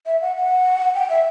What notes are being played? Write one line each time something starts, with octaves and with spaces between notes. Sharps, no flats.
E5
F#5
F#5
G5
E5